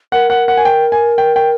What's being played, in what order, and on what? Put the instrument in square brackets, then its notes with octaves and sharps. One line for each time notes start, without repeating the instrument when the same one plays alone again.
[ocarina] A#4 [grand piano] F#5
[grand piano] F#5
F#5
G#5
G5
G#5
G5
G5